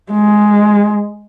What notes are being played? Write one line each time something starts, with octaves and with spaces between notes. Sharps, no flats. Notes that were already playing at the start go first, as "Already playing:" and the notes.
G#3